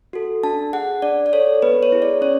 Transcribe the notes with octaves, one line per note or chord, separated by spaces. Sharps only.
F#4 A4
D4 A5
G#4 F#5
D4 D5
D5
A4 C#5
B3 B4
C#5
E4 G#4
D5
C#4 C#5